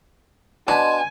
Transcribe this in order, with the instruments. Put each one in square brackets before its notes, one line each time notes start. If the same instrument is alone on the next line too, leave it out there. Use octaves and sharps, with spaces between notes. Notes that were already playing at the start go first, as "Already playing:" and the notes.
[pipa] B2 [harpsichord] D4 [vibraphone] D#5 C6 [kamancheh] G#5